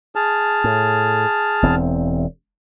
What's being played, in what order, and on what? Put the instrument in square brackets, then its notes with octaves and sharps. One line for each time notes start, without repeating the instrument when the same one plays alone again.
[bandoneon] G#4 A5 F6
[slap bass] A2
E1 E2 C4